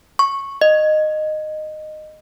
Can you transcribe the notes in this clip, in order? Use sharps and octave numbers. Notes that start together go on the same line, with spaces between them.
C#6
D#5